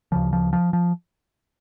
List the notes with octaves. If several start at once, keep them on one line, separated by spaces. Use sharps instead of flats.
D2 C#3 F3
F3
F3
F3